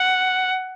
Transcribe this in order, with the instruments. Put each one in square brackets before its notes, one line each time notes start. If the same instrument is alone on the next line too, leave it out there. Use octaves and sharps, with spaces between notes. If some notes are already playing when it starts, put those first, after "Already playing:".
Already playing: [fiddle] F#5